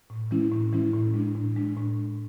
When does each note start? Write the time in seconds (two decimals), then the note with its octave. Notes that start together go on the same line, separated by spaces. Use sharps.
0.10 A2
0.31 E3 G#3 C#4 E4
0.52 A2
0.73 E3 G#3 C#4 E4
0.94 A2
1.14 G#3 D4
1.35 A2
1.56 G#3 D4
1.77 A2